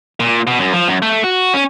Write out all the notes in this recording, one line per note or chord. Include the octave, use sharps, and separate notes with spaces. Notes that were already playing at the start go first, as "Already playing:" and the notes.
A#2
B2
F#2
F3
F#2
A3
F#4
C#4